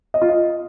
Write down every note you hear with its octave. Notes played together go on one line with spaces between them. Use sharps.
D#5
F4
D#5